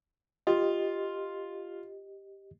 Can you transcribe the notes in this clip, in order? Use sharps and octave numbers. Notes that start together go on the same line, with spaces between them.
F4 G4 D#5